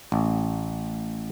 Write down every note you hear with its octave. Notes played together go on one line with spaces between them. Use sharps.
A1